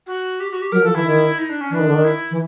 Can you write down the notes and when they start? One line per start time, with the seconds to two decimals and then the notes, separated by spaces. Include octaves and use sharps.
0.06 F#4
0.40 G4
0.51 F#4
0.61 G4
0.72 F#3 A#4
0.83 F3 A4
0.95 E3 E4
1.05 D#3
1.38 D#4
1.49 D4
1.60 C#4
1.70 E3 D4
1.80 D#3
1.87 D3
1.95 D#3
2.04 E4
2.31 E3